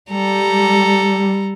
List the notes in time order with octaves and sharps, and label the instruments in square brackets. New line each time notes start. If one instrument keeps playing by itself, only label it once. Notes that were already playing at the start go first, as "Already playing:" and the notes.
[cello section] G3 [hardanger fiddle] A4 A#5